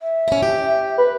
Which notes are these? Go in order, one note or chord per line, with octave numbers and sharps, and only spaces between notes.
E5
C#4 E4
G4
B4